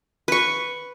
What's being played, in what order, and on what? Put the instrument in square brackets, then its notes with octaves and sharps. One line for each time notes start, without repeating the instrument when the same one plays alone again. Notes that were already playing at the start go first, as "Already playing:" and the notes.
[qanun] B4 C#6